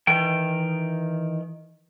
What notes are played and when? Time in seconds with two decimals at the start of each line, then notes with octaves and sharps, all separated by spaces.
0.07 D#3 E3 G5